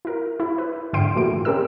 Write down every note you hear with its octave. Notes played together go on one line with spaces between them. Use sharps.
E4 A#4
E4
B4
G#2 D3 E5 G5 C6 D7
A#2 E3 F3 A3 F#4 D7
C4 C#4 G4 A#4 E6